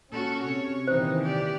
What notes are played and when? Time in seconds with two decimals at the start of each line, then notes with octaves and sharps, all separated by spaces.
0.12 A#2 C#4 F#4 A4
0.44 C3 C#5
0.87 A#2 D#3 E3 D#4 C5
1.23 G4 D5